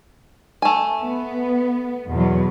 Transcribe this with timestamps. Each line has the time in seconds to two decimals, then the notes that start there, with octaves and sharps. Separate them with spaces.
0.62 A3 G#5
1.02 B3
2.11 E2 B2 F#3